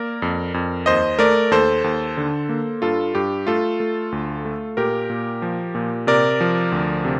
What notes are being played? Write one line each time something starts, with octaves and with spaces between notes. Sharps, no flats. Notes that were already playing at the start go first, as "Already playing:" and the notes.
Already playing: A#3 A#4 D5
F2
F2
D#2 C5 D#5
A3 A#4 D5
D#2 A4 C5
D#2
D3
A#3
G2 F4 A4
G2 G4
A3 F4 A4
A3
D2
A3
A#2 G4 A#4
A#2
F3
A#2
C3 A#4 D5
F3
D2
C3